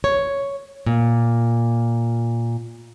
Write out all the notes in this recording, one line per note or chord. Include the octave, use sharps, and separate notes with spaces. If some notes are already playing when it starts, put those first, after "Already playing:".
C#5
A#2